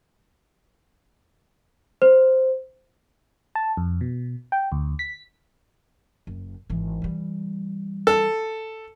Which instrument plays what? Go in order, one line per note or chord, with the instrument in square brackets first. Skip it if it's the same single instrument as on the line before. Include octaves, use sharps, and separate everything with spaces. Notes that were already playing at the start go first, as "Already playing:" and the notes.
[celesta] C5
[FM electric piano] A5
F2
B2
G5
D2
B6
[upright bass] F#1
G#1 E3
E3 G3
[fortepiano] A4